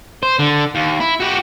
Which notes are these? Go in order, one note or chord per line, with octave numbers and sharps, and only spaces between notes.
C5
D3
D#2
E4
F#4 G4